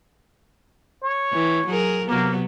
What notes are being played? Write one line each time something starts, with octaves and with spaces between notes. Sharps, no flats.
C#5
E3
F#3 G#4 A#4
C3 F#3 A#3 B3